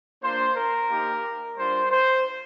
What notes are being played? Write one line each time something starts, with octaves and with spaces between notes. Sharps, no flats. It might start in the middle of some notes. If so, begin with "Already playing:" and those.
A#3 D4 F4 C5
A#4
A#3 D#4 G4
G3 D4 F4 C5
C5